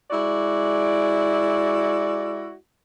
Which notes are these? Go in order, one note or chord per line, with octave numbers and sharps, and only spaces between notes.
G#3 E4 F#4 D5